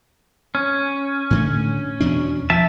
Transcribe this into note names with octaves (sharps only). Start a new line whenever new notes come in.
C#4
A2 D3 A3
E2 B2 D4
F3 E5 A5